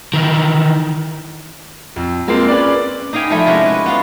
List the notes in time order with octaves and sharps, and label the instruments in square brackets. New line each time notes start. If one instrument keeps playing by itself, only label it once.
[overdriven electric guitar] D#3 E3
[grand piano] F2
G#3 A#3 C4 F4
C#4 B4 D5
[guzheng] D#4 D#5 F5 G5 G#5 B5
F3 G3 A3 E4 G#5 B5
C3 G#3 C#4 F#4 A#4
B4
B3 F4 F5